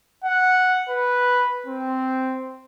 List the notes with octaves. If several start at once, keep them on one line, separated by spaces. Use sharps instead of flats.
F#5
B4
C4